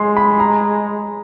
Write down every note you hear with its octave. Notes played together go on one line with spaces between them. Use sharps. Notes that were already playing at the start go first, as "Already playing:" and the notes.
Already playing: G#3 C6
B5
A#5